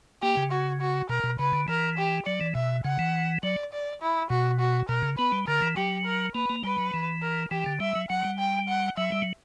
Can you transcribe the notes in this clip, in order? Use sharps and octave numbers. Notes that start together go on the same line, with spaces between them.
A#3 G4
C#3
F#4
F#4
B2 A#4
B2
C#3 B4
D3
E3 A#4
G4
F#3 D5
E3
B2 E5
C#3 F#5
E3
F#3 D5
D5
E4
B2 F#4
F#4
B2 A#4
C#3
B3 B4
G3
D3 A#4
E3
F#3 G4
A#4
A#3 B4
A#3
G3 B4
F#3
E3
A#4
E3 G4
D3
G3 E5
F#3
F#3 F#5
G3
G5
F#5
F#3 E5
G3
F#3